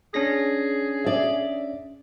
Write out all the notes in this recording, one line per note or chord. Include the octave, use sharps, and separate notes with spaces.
C#4 D4 G#4 A#6
D5 E5